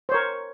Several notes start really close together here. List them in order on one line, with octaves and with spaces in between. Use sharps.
C5 C#5 A#4